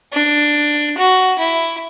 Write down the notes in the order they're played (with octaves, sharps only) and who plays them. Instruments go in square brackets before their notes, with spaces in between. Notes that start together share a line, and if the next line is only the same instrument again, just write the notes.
[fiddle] D4
F#4
E4